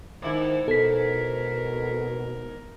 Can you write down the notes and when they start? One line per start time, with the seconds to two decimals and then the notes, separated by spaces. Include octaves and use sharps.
0.22 G#2 D#3 E4
0.68 B2 A4 A#4 B6